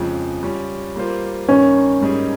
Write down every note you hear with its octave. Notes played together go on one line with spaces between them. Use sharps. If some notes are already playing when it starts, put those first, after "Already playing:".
Already playing: F2 C#3 F3 G#3
G3 C#4 F4
G3 A#3 F4 C5
G2 D#3 A#3 C#4
G#2 G3 A#3 D#4 G#4